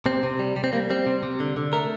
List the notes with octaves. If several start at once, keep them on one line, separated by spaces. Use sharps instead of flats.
C3 C4
C3
G3
G3
C4
G3 A#3
G3 C4
C3
C3
D3
D3
A3 A#4